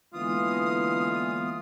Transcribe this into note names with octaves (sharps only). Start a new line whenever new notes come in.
D3 E3 G#3 A#3 B3 F4 D#6